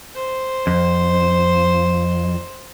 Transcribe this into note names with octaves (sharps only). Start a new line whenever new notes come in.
C5
F2